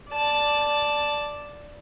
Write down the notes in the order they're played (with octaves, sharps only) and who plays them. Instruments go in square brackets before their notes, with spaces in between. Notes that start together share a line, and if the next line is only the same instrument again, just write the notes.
[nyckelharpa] D5 A5